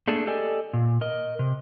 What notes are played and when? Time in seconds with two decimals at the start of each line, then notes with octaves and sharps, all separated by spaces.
0.08 A3 A#3 D4 G#4 A4
0.27 G4 A4 D5 D#5 G#5
0.73 A#2
1.01 A#4 D#5
1.39 C3